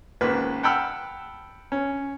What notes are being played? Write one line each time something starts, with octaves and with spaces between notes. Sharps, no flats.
G#1 C#2 A#3 B4
F#5 G5 A5 B5 E6 F6
C#4